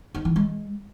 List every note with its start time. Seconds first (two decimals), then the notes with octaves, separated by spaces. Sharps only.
0.15 D#4
0.25 E3
0.36 G#3